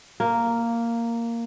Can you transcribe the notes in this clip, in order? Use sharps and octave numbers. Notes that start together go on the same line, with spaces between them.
A#3